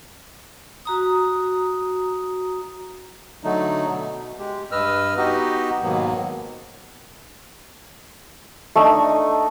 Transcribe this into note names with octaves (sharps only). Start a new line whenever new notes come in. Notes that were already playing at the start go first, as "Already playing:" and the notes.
F#4 A#5 D#6
D3 F#3 A3 D#4
B2
G#3 G4
G2 B4 D#5 E6 F6
B3 D#4 F#4 G4 D#5
G#2 B2 D#3 F#3 A#3 B3
A3 D4 D#4 D#6